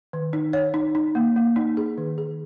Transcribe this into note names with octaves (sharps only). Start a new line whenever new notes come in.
D#3
D#4
C#5
D#4
D#4
A#3
A#3
D#4
G#4
D#3
G#4